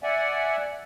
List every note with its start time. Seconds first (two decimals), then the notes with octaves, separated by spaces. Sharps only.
0.03 D5 E5 F#5 G#5